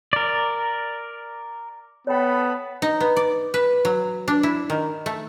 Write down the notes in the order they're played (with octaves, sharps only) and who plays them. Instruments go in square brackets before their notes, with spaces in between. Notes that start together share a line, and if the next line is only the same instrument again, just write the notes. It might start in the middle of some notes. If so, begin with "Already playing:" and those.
[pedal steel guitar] A#4 D5
[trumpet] B3 [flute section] A4 A5 B5 [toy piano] C#5 G5
[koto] D#4
B3
D5
B4
F#3
D4
E4
D#3
A3